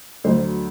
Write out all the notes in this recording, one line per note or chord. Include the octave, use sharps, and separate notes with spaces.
D2 D3 F#3 C5